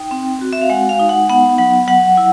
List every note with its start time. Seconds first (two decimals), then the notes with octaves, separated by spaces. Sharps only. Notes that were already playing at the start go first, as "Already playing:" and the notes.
Already playing: D#4 G5
0.11 C4
0.41 F#4
0.53 E5
0.62 F5
0.70 G#3 F#5
0.89 F5
1.00 D#4
1.09 F#5
1.30 B3 F#5
1.58 F#3 F#5
1.88 F#3 F#5
2.17 E4